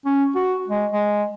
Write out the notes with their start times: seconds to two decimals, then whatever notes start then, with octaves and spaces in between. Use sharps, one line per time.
0.06 C#4
0.35 F#4
0.68 G#3
0.92 G#3